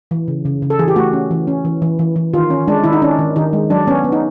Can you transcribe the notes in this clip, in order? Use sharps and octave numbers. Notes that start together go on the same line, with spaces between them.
E3
C#3
C#3
C#3
A4
E3 G#4
G4
A3 F#4
C#4
E3
C#4
E3
E3
E3
E3
D#3 F4
C#4
G#3 D4
D#3 E4
D#4
C#4 D4
D#3
D#3 D#4
G#3
F#3 D4
B3 C#4
B3
D#4